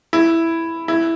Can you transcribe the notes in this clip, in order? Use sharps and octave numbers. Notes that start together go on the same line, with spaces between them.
E4
E4